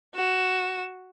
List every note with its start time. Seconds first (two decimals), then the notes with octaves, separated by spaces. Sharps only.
0.15 F#4 E7